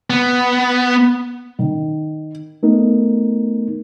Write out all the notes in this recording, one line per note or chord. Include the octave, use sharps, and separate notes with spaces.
B3
D#3
A3 B3 D#4 A#4